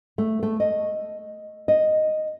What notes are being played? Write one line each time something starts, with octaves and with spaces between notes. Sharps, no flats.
A3
A3
D#5
D#5